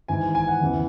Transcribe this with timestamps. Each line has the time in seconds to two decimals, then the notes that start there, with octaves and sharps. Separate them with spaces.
0.08 G#1 G#2 E3 G#5
0.35 G#5
0.48 F#5
0.61 E2 C#3 E3